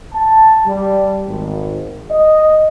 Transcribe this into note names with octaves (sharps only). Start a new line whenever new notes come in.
A5
G3
G#1
D#5